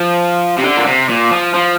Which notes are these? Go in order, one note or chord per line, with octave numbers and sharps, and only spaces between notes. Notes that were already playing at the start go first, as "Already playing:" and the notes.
Already playing: F3
C3
D3
A#2
C3
A#2
F3
F3